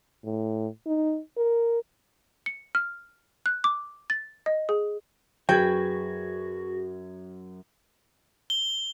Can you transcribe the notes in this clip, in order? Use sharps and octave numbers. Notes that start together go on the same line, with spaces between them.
A2
D#4
A#4
C#7
F6
F#6
D6
A6
D#5
G#4
F#2 F#4 G#4 B4 G5 G#6
G7